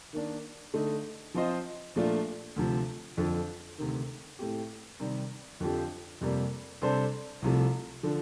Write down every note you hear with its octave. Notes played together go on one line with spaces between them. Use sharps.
D#3 A#3 D4
D3 A3 D#4
F3 C4 F4 C5 D#5
A#2 F3 A3 D4 F4
D2 C3 F3
F2 D3 F3
D2 C3 D#3
A2 A3 C4 G4
C3 D#3 G3
F2 D3 F3 C4 G4
F2 C3 G3 A#3
C3 G3 D4 A4 C5
C2 C3 F3 A3
D3 F3